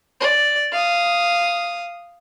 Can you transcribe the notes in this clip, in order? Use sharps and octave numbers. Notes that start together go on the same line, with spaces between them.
D5
F5 D#6